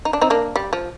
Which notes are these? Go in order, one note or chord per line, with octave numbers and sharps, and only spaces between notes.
D#4
D4
C4 D#4
A#3 D4
G3
F3